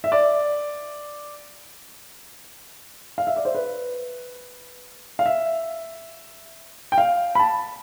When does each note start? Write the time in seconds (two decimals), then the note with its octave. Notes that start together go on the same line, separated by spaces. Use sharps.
0.04 E5
0.12 D5
3.18 F5
3.27 E5
3.36 D5
3.45 C5
3.55 B4
5.19 F5
5.26 E5
6.92 G5
6.98 F5
7.35 B5
7.39 A5